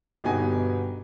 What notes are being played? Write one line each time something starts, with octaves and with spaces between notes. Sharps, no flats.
G1 B2 D#4 F#4 G4 G#5